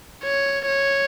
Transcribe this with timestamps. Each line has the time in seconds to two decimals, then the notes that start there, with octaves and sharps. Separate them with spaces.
0.23 C#5
0.67 C#5